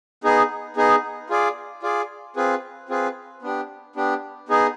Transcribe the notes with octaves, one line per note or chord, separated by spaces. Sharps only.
B3 D#4 G#4
B3 D#4 G#4
F4 G#4 D5
F4 G#4 D5
C4 F4 G#4 B4
C4 F4 G#4 B4
B3 D4 G4
B3 D4 G4
B3 D#4 G#4